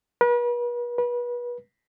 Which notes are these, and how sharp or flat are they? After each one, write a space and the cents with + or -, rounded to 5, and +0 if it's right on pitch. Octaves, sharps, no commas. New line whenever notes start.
B4 -40
B4 -30